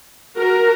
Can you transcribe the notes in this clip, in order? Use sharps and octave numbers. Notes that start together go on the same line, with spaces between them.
F#4 A#4